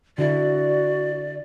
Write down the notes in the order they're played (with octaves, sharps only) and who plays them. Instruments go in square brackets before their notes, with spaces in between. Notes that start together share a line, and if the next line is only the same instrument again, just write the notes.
[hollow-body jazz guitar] D3 E4 [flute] F#4 [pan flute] D5